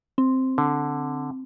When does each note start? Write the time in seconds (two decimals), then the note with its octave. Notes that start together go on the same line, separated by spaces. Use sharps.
0.18 C4
0.58 D3